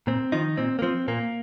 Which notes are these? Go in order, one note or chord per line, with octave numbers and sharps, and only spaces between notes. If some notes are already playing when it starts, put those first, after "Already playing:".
A#2 C4
D#3 F3 D#4
A#2 C4
A#3
F3 C4
A#2 A#3